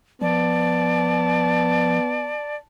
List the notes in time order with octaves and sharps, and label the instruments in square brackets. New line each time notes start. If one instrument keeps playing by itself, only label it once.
[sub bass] F3 [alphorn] B3 [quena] D5 [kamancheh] A5